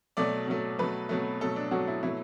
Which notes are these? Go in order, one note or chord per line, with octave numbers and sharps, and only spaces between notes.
B2 F#3 A3 D5
B2 F#3 A3
B2 F#3 A3 B4
B2 F#3 A3
B2 F#3 A3 A4
D4
B2 F#3 A3 F#4
E4
B2 F#3 A3 E4